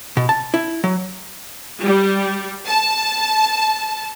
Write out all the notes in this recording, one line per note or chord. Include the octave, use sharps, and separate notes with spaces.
B2
A5
E4
F#3
G3
A5